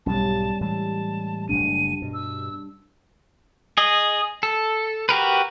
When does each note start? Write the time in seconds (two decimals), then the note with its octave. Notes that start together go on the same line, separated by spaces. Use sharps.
0.06 B1 G#2 B2 G3 C#4 A5
0.61 A2 E3 G#3 A5
1.49 F#1 F2 A3 D4 D#7
2.02 G2 B2
2.14 E6
3.78 G#4 D#5
4.43 A4
5.09 F#4 G4 A#4 B4